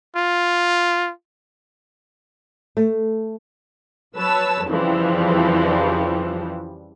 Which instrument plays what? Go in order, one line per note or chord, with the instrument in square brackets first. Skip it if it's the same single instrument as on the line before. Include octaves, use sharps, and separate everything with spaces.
[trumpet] F4
[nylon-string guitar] A3
[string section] F#3 B4 C#5 A5 E6
F2 C#3 E3 F3 G3